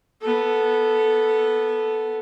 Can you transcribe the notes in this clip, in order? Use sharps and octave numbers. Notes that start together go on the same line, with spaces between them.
B3 A4